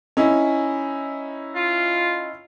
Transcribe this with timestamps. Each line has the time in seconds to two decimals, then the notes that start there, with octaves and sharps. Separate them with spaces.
0.17 C#4 D#4 E4
1.55 F4